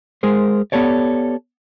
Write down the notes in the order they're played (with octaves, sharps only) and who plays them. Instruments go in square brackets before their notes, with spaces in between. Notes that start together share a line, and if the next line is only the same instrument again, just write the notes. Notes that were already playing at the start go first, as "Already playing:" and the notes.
[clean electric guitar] G#3 G#4 A#4 C5
B3 G4 A4 C#5 D5